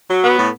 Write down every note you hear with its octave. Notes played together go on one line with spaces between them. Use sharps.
F#3
B3
A2